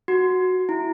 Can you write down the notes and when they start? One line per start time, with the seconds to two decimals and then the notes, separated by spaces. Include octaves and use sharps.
0.08 F#4
0.69 E4